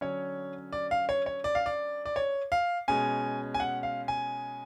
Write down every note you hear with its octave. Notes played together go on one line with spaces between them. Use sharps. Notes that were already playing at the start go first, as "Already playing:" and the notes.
D3 F#3 C#4 C#5
D5
F5
C#5
C#5
D5
F5
D5
D5
C#5
F5
B2 G#3 C#4 G#5
G#5
F#5
F5
G#5